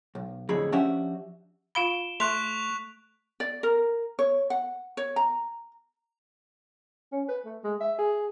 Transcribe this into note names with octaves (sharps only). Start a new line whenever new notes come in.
B1
F2 A2 D3 F#3 G#4 B5
F3 C#4 D4 F#4 G4 E5
F4 F5 B5 D7 E7 G7
A3 C6 C#6 F#6 B6 F7
D5
A#4
C#5
F#5
C#5
A#5
C#4
B4
A3
G#3
E5
G#4